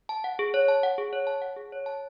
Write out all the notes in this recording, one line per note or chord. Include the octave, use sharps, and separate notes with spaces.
A5
F#5
G#4
C#5
A5
F#5
G#4
C#5
A5
F#5
G#4
C#5
A5